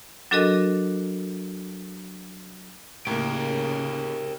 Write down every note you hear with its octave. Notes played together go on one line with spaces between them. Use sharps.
F#3 D4 F#4 A4 A#4 D#5
A2 C#3 A#3 G4 A#4